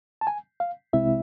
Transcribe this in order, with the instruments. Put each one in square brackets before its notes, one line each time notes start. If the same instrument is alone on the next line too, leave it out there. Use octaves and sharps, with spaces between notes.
[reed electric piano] A5
G#5
F5
C2 C3 G#3 C4 E4 E5